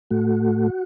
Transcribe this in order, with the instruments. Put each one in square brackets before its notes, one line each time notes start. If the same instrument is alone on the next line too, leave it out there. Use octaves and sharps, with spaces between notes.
[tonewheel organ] A2 A3 F#4